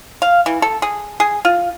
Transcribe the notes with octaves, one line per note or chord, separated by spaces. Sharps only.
F5
E3
A4
G#4
G#4
F4